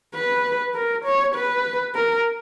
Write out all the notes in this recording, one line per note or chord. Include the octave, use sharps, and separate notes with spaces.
B4
A#4
C#5
B4
A#4